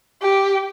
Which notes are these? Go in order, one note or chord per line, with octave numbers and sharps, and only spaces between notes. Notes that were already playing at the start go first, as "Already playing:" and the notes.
G4